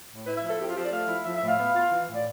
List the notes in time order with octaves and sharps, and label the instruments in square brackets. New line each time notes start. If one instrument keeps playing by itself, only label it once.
[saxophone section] A2
E4 B4
E5
F3
A4
C4 G4
F4
F3 G4
D5
A3 F5
E4
F3 E5
E5
A2
F5
B3
F4
E3
A2
D5